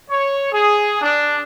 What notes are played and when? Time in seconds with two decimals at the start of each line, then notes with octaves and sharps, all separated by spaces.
0.10 C#5
0.53 G#4
1.02 D4